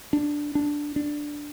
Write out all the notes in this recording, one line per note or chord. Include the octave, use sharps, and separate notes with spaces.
D4
D4
D4